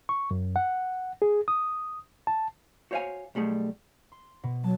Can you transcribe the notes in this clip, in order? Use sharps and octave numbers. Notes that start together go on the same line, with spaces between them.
C#6
F#2
F#5
G#4
D#6
A5
F#4 C5 C#5 E5 F5 G#5
B1 G3 A3 G#4
C6
B2
F#3 A5